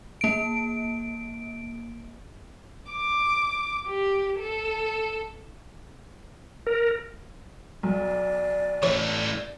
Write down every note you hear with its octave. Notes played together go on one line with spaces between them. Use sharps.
A#3 D7
D6
G4
A4
A#4
B1 D5
E3 A3 C#5